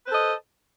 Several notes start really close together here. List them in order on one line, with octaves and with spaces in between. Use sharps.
B4 C5 A4 D#5